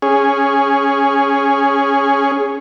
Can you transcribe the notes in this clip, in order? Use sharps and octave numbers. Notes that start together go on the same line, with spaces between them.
C#4 G#4